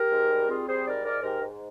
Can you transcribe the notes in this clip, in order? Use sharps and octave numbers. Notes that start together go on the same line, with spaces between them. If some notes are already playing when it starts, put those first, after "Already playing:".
Already playing: G4 A#4
G#2
G3
C4 F4 G#4
G3 G#4 C5
G#2 A#4 D5
G#2 A#4 D5
G#2 G4 A#4
G#2